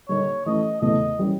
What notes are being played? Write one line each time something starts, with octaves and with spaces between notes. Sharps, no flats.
D3 G3 A#3 D#4 C#5
E3 A3 C#4 D#5
E2 C#3 E3 A3 D#5
E3 G3 A#3 C#4